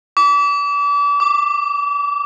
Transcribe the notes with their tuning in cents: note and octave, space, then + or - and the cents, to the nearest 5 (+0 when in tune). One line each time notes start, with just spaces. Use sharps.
D6 -35
D6 +0